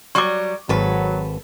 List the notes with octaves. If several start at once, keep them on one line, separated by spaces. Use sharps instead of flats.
F#3 G3 C#6 D6
G#1 F#3 A4 B4